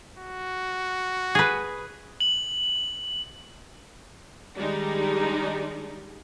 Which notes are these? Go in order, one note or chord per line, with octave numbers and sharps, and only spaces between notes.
F#4
G#4 B4
F#7
D#3 G3 G#3 D4 D#4